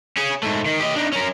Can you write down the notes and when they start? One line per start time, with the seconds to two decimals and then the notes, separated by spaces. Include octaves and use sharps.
0.16 C#4 G#4
0.43 G#2 A3
0.66 D#3
0.80 G4 D#5
0.96 D4 D#4
1.13 C#4 A#4